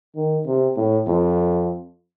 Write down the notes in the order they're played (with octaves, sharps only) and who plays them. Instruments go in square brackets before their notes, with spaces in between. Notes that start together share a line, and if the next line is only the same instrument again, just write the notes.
[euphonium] D#3
C3
A2
F2